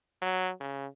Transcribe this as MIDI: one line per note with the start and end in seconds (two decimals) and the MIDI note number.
0.22 0.51 54
0.60 0.87 49